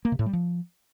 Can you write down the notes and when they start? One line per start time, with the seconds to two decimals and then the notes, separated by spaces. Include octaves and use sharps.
0.05 A#3
0.12 C3
0.19 A2
0.26 G3
0.33 F3